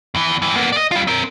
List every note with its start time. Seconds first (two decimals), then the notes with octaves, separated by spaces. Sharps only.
0.15 E2 E3
0.42 G2 E3
0.56 A#3 B3
0.73 D5 D#5
0.92 G3 F4
1.07 C4 A#4